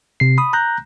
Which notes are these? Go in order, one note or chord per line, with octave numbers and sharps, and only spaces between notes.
C3 C7
B5 D#6
A#5 F#6 G6 A#6